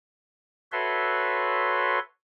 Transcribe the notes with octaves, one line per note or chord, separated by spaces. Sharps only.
F#4 A4 B4 C#5 E5 C6